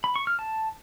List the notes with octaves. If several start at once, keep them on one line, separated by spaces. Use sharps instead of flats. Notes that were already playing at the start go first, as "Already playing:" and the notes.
B5
C#6
F6
A5